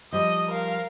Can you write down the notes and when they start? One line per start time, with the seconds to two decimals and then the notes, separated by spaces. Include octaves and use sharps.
0.13 F3 G3 D#5
0.48 A#4 F5